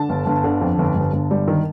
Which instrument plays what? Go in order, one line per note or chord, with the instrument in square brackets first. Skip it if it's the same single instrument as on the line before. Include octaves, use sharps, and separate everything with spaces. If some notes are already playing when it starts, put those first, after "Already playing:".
Already playing: [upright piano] D3 A5
G1
G1
D3
F2
G1
G1
G1
G3
D#3